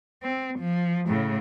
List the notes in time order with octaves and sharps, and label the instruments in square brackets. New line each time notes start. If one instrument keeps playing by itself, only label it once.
[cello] C4
F3
A2 C#3